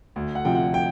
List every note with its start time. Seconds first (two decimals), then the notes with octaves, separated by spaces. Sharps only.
0.16 D2
0.35 F#5
0.45 C3 F3 G5
0.55 F#5
0.74 G5